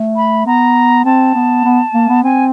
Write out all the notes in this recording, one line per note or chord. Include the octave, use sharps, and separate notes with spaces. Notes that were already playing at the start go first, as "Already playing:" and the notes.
Already playing: A3
B5
B3 A#5
C4 A5
B3
B3
A#3
B3
C4 G#5